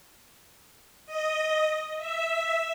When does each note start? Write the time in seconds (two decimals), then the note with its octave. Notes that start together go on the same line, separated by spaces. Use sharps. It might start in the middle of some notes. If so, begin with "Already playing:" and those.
1.06 D#5
1.97 E5